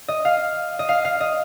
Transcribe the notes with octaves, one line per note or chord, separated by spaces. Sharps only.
D#5
F5
D#5
F5
F5
D#5